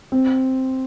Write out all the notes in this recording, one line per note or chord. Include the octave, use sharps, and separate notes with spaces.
C4